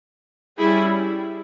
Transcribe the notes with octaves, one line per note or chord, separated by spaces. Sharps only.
G3 C#4 E4 G#4